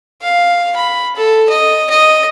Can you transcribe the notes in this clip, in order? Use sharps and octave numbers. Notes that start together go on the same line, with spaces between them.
F5
B5
A4
D#5
D#5